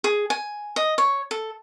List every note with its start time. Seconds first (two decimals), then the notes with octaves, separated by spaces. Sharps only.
0.04 G#4
0.30 G#5
0.76 D#5
0.98 C#5
1.31 A4